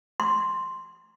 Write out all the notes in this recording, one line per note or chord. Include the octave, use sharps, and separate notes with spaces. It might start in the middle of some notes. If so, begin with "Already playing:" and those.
C6